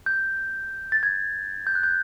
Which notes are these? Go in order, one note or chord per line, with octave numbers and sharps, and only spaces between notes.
G6
A6
G#6
G6
F#6
G6